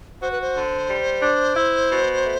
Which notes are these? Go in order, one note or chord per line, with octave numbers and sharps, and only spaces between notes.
F#4 C5
B4
C5
D3
G3
D4
E4
B2
A3